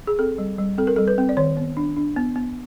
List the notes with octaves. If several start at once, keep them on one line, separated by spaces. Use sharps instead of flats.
G#4
C4 A4
G3
G3
C4 A4
A#4
G3 A4
B4
C4
D5
D#3 C#5
B3
D4
D4
B3
B3